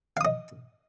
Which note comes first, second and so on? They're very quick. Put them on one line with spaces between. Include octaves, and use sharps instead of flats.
F5 D#6 D#5